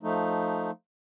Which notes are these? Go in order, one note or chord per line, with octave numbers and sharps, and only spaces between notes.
F3 A3 D#4